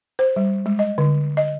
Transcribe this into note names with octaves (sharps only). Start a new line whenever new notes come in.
C5
G3
G#3
D#5
D3
D#5